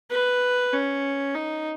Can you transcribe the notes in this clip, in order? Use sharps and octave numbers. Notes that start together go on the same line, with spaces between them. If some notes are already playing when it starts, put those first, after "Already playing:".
B4
C#4
D#4